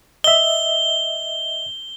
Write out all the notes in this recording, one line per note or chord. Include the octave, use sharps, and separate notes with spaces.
D#5 E5 G7